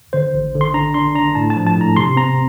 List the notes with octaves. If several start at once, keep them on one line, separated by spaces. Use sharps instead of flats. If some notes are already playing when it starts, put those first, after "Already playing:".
D3 C5
A1
D3
C6
D4 A#5
D4 C6
D4 A#5
A2 A5
A5
F3
A5
A2 A#5
C3 C6
C4 A#5